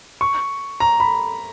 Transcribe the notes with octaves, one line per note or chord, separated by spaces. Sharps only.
C#6
A#5
B5